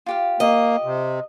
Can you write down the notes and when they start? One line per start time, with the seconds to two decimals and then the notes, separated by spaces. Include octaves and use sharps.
0.06 F4 G4 F5
0.40 A#3 D#5
0.84 C3